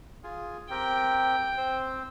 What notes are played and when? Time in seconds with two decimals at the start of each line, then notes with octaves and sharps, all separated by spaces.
0.23 F4 G#4
0.70 C4 G4 A#4 G5
1.57 C4 C5